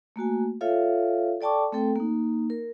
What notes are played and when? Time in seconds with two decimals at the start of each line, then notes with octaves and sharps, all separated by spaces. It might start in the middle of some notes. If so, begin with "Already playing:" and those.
0.16 A3 A#3 F#4 G#5
0.61 F4 A4 C#5 E5 F5
1.41 A4 D5 G5 A5 C#6 D6
1.73 A3 C4 A4 G5
1.96 A#3 D#4
2.50 A#4